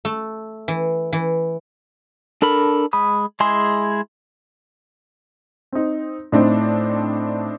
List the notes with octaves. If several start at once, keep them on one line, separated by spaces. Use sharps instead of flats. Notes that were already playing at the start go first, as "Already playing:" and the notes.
A3
E3
E3
D4 A4 A#4 B5
G#3 B5 D#6
G#3 E4 G#4 C6
C4 D#4
A2 C4 D4 D#4